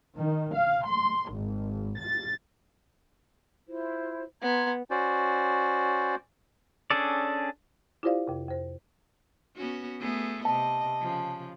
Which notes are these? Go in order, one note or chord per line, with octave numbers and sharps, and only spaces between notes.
D#3
F5
C6
G#1
A6
E4 F4 C5
B3 A#5 C6 G#6
C#4 F#4 C5 D5
C#4 D4 G#4 A4 D5
E4 F4 G4 C5 D5 F5
F2 C3
F2 C5
B3 C#4 F#4
A3 B3 G#4
C3 D#5 A5
C#3 F3